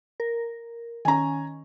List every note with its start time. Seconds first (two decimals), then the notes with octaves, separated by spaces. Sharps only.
0.20 A#4
1.05 D#3 C#4 G#5 A#5